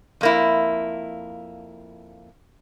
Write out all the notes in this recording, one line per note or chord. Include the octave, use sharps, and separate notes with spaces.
F2 A#3 E4